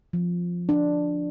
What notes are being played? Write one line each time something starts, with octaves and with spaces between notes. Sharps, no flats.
F3
D4